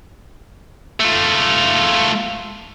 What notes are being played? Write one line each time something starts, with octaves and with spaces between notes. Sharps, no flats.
A3 F4